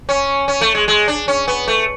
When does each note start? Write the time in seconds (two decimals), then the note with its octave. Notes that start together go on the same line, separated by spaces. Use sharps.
0.09 C#4
0.48 C#4
0.61 A3
0.75 G#3
0.88 G#3
1.08 D4
1.28 C#4
1.48 B3
1.68 A3